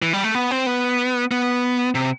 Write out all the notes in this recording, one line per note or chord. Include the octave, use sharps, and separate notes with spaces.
E3
G3
A3
B3
C4
B3
B3
C3